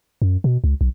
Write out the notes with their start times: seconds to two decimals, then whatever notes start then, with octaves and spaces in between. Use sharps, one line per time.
0.22 F#2
0.44 B2
0.64 C#2
0.81 B1